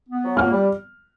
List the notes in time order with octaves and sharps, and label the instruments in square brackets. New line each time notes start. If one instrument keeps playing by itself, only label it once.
[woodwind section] B3
F#3
[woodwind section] A#3 [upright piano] F6
[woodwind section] G3